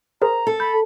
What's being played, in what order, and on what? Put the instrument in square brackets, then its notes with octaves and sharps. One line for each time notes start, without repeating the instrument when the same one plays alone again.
[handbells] G#4 A#4 C5 [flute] A#5
[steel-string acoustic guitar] A4
[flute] B5 [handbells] G6